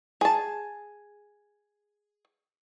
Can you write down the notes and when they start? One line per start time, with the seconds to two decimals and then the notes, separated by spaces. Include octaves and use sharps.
0.21 G#4 A5